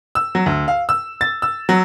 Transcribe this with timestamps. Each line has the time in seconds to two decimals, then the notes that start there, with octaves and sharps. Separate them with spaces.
0.15 E6
0.35 F#3
0.46 D2
0.68 F5
0.89 E6
1.21 A6
1.42 E6
1.69 F#3